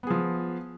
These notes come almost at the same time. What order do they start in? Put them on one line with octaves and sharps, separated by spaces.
B3 G#4 F3